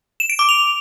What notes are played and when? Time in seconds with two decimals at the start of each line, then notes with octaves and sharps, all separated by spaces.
0.20 E7
0.30 D7
0.39 D6
0.49 F7